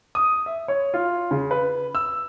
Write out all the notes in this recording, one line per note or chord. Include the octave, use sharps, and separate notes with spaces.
D#6
E5
C#5
F4
C#3
B4
E6